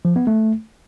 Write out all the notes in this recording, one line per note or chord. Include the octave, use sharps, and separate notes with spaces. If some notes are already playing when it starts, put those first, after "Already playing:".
F3
B3
A3